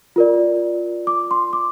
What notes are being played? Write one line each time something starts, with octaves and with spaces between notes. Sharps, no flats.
F4 A#4 D5
D6
C6
D6